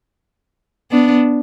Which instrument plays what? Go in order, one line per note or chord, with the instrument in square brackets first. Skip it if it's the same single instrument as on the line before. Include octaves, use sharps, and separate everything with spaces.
[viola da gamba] B3 D4